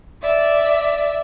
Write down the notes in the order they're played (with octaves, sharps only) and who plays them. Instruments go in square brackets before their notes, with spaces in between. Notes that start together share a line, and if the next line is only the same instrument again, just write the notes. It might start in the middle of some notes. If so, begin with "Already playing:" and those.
[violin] D5 E5